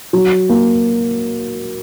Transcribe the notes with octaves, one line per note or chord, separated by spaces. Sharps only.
F#3
A#3